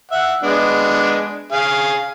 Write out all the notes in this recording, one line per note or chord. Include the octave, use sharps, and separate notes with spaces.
E5 F#5
G#3 B3 D4
G#4 F5